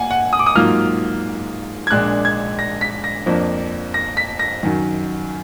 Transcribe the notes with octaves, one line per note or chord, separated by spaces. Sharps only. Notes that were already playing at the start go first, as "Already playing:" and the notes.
Already playing: A#2 A#3 F#5 G#5
F#5
D#6
D6
D#6
G#2 F#3 A#3 F4 F6
G#6
A#1 A#2 G#3 D4 F#6
G#6
A#6
B6
A#6
F2 F3 A#3 D4
A#6
B6
A#6
F#2 D#3 F#3